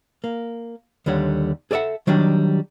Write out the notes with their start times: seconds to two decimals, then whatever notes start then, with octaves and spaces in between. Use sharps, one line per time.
0.24 A#3
1.06 D#2 D3 G3 C#5 F#5
1.71 G#4 A4 D5 E5 F#5
2.07 D#3 F#3 G3 D4 G4